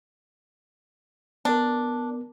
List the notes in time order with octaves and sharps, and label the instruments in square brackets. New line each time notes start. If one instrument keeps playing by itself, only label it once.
[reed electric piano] B3 A#4 [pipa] D4